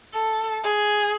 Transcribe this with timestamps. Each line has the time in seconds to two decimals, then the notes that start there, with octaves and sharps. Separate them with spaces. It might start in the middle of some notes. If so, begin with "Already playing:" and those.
0.13 A4
0.63 G#4